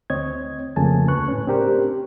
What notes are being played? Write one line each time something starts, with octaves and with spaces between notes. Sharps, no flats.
D2 C4 C#5 D#5 G#6
F2 C#3 A3 A#3 G#5 A5
D2 B4 C#6 F#6
A2 C#4
C4 D4 G4 A#4 C5